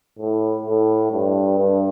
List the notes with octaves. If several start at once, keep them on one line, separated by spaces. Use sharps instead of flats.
A2
A2
G2
G2